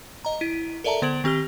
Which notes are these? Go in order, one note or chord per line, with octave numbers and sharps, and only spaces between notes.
D#5 A#5
E4 B6 D#7
A4 A#4 D5 E5 A5 A#5
D3 B3 C5 G#6 D7 F#7
D#3 C4 G4 F6 G7